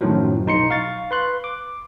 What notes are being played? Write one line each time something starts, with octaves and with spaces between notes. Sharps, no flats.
F#2 A2 D#3 F3 F#3
B1 D#4 C6 C#7
F5 C#6 A6
B4 C6 F#6
D6